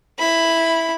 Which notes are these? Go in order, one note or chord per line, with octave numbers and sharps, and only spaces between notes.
E4 B5